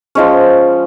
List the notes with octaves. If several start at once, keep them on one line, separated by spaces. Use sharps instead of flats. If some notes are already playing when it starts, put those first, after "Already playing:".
F3 G#3 C#4